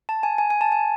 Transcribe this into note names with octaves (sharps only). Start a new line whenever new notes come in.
A5
G#5
G#5
G#5
A5
G#5